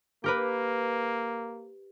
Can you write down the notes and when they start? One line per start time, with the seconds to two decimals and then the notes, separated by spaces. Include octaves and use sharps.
0.24 A#3 G4 A#4 B4